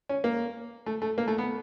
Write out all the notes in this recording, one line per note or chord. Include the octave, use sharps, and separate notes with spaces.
C#4
A#3
A3
A3
A#3
A3
B3